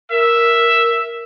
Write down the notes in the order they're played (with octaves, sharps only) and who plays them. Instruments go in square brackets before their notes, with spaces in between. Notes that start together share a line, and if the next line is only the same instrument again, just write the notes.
[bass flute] A#4 [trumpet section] E5